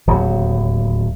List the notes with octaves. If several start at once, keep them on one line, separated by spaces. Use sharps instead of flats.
D1 D#2 F#3